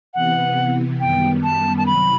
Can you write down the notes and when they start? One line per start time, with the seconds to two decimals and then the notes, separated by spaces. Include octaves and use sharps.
0.14 C3 E3 B3 F#5
1.00 F#2 D#3 G3 B3 G5
1.43 A5
1.78 A5
1.86 C3 D#3 F#3 B5